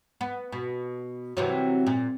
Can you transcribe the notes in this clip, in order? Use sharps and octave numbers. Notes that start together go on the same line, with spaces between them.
B3
B2
C3 E3 F#3
A#2